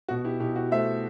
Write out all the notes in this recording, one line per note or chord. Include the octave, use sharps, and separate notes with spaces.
B2 F#4
E4 G4
B2 E4 G4
F#4
A3 C5 E5